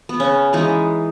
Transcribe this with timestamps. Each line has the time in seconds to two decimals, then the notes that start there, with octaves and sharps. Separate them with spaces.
0.09 B3
0.20 C#3 C#4
0.53 E3 G#3 B3 D#4